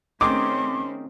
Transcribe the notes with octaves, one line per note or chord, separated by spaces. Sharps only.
D#3 A3 C4 C#4 G#4 A#5 C6 D6